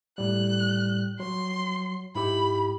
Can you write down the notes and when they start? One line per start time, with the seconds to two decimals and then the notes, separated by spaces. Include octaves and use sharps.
0.18 A2 G3 F#6
1.20 F#3 C6
2.15 G#2 E4 G4 B5